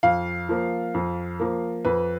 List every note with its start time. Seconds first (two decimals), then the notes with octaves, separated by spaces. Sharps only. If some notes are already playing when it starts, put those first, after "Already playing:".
0.03 F2 F5
0.49 F3 A#3
0.94 F2
1.40 F3 A#3
1.85 F2 B4